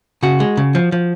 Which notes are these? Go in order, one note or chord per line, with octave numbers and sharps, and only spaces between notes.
C#3 F#4
G#3
C#3
F3
F3